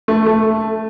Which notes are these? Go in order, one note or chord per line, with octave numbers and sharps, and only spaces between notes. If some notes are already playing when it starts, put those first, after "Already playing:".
A3
A3